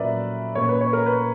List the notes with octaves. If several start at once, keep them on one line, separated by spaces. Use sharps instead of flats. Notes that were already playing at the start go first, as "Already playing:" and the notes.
Already playing: A#2 F#3 C#4 A#4 B4 D5 E5
A#2 A#3 C#4 C#5
B4
C#5
A#4
B4